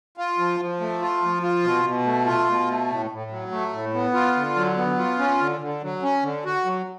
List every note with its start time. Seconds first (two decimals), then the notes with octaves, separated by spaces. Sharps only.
0.17 F4
0.38 F3
0.60 F3
0.80 A3
1.01 F4
1.22 F3
1.43 F4
1.63 B2
1.85 B2
2.05 A3
2.26 F4
2.48 B2
2.68 A3
2.90 A2
3.11 A2
3.30 F#3
3.51 A3
3.73 A2
3.94 B3
4.14 F4
4.36 D3
4.56 F#3
4.77 B3
4.99 F4
5.19 C#4
5.40 D3
5.61 D3
5.82 F#3
6.02 C#4
6.23 D3
6.45 F#4
6.65 F#3